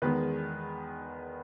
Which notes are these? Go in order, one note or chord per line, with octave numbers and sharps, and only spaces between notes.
E2 D#3 G#3 B3 B4